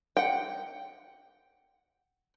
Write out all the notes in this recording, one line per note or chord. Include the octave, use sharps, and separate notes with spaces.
F#5 G5